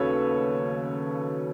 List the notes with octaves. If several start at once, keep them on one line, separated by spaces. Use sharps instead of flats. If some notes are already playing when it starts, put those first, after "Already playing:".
Already playing: D#2 C#3 F#3 A4 B4 C#5